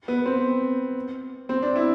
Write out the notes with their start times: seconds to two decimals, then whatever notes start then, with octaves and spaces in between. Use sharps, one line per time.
0.08 B3
0.26 C4
1.49 C4
1.62 D4
1.76 E4